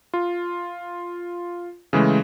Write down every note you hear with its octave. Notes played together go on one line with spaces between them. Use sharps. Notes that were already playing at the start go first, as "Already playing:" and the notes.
F4
C#3 E3 G#3 A3